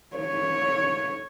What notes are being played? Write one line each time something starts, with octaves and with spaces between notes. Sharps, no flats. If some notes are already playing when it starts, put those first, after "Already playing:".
C#5